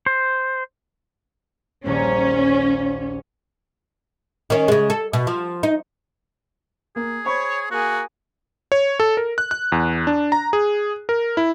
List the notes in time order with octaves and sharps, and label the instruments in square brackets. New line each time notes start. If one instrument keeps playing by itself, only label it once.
[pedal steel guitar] C5
[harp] D#1 A#1 A#5 [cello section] C#4
[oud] D#3 C#4
C#3 G#3
A4
B2
F3
D#4
[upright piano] A#3 [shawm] G#4
[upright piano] C5 B5 C#6 [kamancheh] C#5
[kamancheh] A#3 G#4 [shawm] F#4
[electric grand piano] C#5
A4
A#4
F#6
F#6
E2
D4
A#5
G#4
A#4
E4